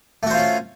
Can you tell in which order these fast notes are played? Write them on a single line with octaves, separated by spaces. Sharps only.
A3 F#4 C5 F4 C#4